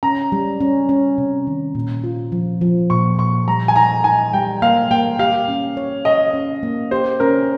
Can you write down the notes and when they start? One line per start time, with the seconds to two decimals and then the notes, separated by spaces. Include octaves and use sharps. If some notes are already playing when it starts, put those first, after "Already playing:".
0.03 C#4 A#5
0.32 G3
0.60 C#4
0.89 C#4
1.18 C3
1.47 D#3
1.75 A#2
2.04 F4
2.32 F3
2.61 F3
2.90 A#2 C#6
3.19 A#2 C#6
3.48 G3 A#5
3.68 G#5
3.76 D#4 A#5
4.04 D#4 G#5
4.33 G3 G5
4.62 A#3 F5
4.91 A#3 G5
5.19 G4 F5
5.48 C#4
5.77 C#5
6.05 C#5 D#5
6.34 C#4
6.63 A#3
6.91 G4 C5
7.20 C#4 A#4